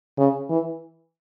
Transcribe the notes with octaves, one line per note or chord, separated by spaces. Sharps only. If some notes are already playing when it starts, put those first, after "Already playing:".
C#3
E3